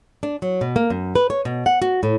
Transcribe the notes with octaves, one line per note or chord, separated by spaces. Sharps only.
D4
F#3
B2
A#3
F#2
B4
C#5
B2
F#5
F#4
A2